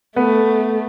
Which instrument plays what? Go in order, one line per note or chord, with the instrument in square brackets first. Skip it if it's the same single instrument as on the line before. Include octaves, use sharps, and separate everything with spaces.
[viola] A3 [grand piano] B3